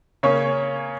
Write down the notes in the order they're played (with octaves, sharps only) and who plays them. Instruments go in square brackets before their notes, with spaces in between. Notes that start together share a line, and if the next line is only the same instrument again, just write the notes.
[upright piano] C#3 A#3 C#4 C#5